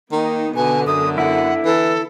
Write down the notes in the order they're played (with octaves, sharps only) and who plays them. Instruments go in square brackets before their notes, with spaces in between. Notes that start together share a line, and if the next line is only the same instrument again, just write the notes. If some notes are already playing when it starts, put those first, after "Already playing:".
[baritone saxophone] D#3 [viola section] A#3 D#4
[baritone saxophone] B2 [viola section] D3 B3 [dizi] G#5
[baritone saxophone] F#2 [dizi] D#6
[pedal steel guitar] E4 [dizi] F#5
[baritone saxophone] E3 [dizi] A4